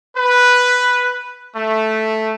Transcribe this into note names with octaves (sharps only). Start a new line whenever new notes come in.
B4
A3